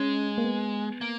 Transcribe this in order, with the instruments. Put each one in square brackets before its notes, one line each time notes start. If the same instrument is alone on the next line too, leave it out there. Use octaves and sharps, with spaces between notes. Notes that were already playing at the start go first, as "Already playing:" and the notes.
Already playing: [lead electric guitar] G#3 [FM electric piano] C#4
[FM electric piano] A#3
B3
[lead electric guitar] A#3